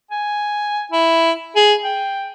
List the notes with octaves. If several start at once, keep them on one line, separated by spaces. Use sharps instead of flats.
G#5
E4
G#4
G5